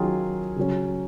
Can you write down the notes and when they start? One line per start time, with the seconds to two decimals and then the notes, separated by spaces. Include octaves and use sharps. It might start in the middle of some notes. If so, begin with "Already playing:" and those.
Already playing: D#3 F#3 C#4 F4 G#4
0.56 C#3 F#3 C#4